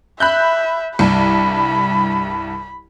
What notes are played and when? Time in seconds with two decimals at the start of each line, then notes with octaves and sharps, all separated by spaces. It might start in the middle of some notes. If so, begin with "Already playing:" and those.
0.20 E5 B5 F#6 G6
0.99 C2 G2 B5